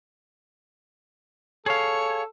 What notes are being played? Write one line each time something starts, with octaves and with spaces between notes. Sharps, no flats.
G#4 A4 C#5 F5